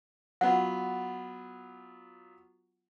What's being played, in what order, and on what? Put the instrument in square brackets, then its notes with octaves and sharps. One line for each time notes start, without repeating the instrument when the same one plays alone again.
[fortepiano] F#3 B3 F4 [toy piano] F#5